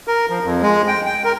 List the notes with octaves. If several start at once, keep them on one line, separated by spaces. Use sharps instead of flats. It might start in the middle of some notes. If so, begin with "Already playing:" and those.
A#4
F3
F2
G#3
G5
G5
A#4